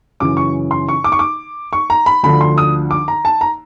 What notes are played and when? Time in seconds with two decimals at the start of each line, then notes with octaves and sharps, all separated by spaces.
0.20 F#2 C#3 E3 D6
0.37 C#6
0.71 C6
0.88 C#6
1.04 D6
1.12 C#6
1.19 D6
1.73 C#6
1.90 A#5
2.06 B5
2.23 D2 D3 F3 B5
2.41 C6
2.58 D#6
2.91 D6
3.08 A#5
3.25 A5
3.41 A#5